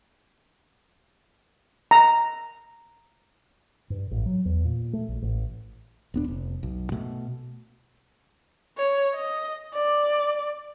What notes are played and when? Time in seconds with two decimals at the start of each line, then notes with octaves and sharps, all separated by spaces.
1.91 A#5
3.90 G2
4.11 A1
4.26 F#3
4.45 E2
4.65 A#2
4.93 A3
5.08 A#1
5.22 A1
6.14 D#1 B3 D4
6.28 F1
6.63 B1
6.92 B2 A3
8.78 C#5
9.14 D#5
9.74 D5